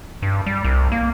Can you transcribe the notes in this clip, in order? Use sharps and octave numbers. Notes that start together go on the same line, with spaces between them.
G2
G3
C2
A#3